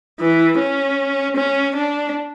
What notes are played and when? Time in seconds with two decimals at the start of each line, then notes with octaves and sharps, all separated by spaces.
0.20 E3
0.59 C#4
1.37 C#4
1.75 D4